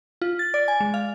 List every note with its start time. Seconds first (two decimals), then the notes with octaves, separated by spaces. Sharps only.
0.21 F4
0.39 A6
0.54 D5
0.68 G#5
0.80 G#3
0.94 F5